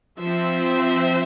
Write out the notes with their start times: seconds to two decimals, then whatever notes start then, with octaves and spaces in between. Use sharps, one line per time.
0.20 F3 C4 C5 E5